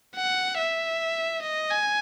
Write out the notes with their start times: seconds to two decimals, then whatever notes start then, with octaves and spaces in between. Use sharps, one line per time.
0.16 F#5
0.58 E5
1.42 D#5
1.70 G#5